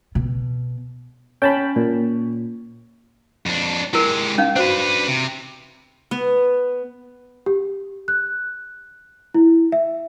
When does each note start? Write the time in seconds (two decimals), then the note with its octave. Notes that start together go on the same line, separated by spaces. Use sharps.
0.15 B2
1.42 C#4 G5 A5 B5
1.76 A#2
3.46 F2 D4
3.94 G#3 E4 G4 A#4
4.38 C#4 D#4 F5
4.56 D4 F#4 B4 C5
5.08 C3
6.11 B3
7.46 G4
8.08 F#6
9.34 E4
9.72 E5